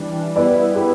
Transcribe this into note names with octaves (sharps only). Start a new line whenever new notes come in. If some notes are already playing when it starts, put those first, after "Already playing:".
Already playing: E3 G3 D4
G3 B3 E4 B4 D5
G4 B4